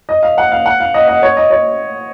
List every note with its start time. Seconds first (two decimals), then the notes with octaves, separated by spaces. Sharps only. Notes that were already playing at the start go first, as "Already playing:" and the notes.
0.09 D#5
0.23 F5
0.38 F#5
0.52 F5
0.66 F#5
0.80 F5
0.94 D#5
1.08 D#5
1.23 C#5
1.37 D#5
1.50 C#5